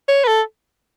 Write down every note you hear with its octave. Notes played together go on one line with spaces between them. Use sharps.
C#5
B4
A4